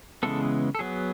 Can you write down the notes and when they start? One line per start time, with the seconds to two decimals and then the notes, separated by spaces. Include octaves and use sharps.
0.23 C#3 E3 G#3 B3 A4
0.75 A4
0.79 F#3 B3 G#4